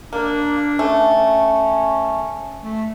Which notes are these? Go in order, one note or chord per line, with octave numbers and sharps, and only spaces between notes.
A#3 D4
A3 C#4
A3